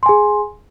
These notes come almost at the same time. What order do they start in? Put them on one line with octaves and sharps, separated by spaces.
C6 G#5 G#4